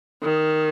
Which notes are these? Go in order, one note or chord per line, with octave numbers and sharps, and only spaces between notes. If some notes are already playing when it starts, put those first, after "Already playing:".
D#3